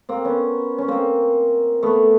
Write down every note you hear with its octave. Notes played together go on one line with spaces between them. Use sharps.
A#3 C4
B3 C#4
C#4
A#3 C4
A3 B3